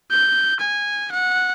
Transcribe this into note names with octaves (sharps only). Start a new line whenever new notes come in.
G6
G#5
F#5